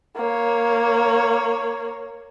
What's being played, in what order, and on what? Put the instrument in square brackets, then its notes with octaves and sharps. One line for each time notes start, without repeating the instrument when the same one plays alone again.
[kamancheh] A#3 C#5